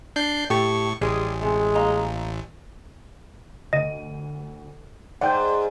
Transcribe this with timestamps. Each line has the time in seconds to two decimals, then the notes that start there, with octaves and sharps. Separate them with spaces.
0.16 D4 G6 C7
0.50 A2 G4 A4 C#6
1.02 A1 G3 G#3 G#4
1.42 C3 G#3
1.75 A#3 D#5 A#5
3.73 D2 D#5 D#7
5.21 G#2 D5 F#5 G5 G6